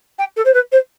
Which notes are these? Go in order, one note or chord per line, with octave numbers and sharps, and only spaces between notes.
G5
A4
C5
B4
C5